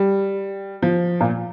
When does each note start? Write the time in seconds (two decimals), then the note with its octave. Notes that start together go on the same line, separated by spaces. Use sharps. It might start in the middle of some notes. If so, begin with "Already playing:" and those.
Already playing: G3
0.82 F3
1.21 A#2